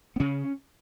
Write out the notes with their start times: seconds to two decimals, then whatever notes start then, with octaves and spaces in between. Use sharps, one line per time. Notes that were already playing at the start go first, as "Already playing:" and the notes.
0.16 B3
0.20 C#3 C#4